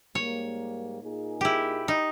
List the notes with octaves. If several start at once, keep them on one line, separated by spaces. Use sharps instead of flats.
G#2 G3 A#3 C#5
A#2 A#3 D#4 G#4
E4 G4
D#4